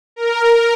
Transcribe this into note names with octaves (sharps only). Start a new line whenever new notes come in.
A#4